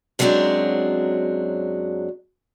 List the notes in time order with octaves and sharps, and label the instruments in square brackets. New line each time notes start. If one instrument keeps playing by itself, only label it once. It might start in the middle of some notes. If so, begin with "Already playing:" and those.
[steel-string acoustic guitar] F#2 F#3 G#3 A#3 C4 D4